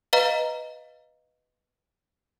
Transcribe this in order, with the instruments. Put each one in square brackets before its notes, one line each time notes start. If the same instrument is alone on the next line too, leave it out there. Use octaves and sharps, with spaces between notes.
[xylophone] B4 D#5 F5 A#5